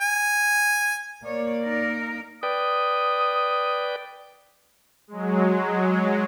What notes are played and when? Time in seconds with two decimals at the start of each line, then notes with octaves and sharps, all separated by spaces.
0.01 G#5
1.25 A#3 C#5 D5
1.63 D#4 A#4
2.43 B4 D5 G5 D#6
5.08 F#3 G#3